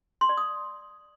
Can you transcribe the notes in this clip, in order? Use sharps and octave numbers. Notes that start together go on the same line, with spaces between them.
C6
D5
D#6